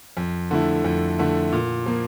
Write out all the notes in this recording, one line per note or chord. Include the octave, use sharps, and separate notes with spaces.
F2
D3 A3 E4
F2
D3 A3 E4
A#2
F3 A#3